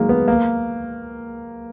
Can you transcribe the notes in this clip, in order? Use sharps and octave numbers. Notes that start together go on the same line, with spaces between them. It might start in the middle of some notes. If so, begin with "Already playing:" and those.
Already playing: D#3 F#3 G#3 A#3
B3
A#3